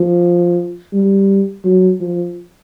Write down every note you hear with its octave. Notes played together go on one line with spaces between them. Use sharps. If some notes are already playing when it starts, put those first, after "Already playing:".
Already playing: F3
G3
F#3
F3